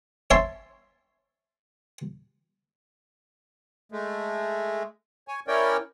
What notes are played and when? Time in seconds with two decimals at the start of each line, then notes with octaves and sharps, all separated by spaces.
0.31 C#5 E5 A5 C6
3.92 G#3 A3
5.28 C#5 G#5
5.48 C#4 E4 A#4 C#5 D5 G5